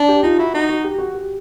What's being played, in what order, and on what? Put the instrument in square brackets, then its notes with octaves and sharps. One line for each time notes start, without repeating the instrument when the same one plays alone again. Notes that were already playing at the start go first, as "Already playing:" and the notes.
Already playing: [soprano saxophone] D4
[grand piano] G4
[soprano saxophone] D#4 [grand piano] F4
[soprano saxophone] E4 [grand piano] F#4
[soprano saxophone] D#4 [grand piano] F#4
[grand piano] F#4
G4
F#4
G4